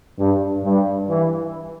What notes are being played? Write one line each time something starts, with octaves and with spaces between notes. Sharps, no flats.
G2
G2
E3